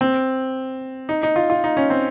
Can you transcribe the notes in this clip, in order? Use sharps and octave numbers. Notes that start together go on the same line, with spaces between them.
C4
D#4
D#4
F4
F4
D#4
C#4
C4